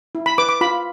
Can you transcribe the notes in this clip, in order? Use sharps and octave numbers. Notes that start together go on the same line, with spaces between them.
E4
B5
B4 D6
D6
F4 B5